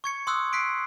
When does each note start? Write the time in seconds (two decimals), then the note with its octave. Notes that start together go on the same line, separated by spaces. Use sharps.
0.04 C#6 G#6 C#7
0.27 C6 D#6 E6 F#6 G#6
0.53 F#6 B6 C7 D7